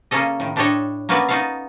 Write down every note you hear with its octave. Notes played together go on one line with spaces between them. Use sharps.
C#3 A#3 C#4 A4 D#5
A2 D#3
A2 D4 G4 A4 C#5 D#5
A#3 B3 C#4 F#4 B4 D5
D#4 F4 F#4 A4 E5 F5